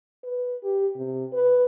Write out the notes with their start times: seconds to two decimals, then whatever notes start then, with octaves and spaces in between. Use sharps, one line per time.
0.24 B4
0.63 G4
0.97 C3
1.33 B4